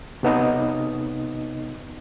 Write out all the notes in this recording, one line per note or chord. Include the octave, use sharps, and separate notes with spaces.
C3 B3 D#4 D#5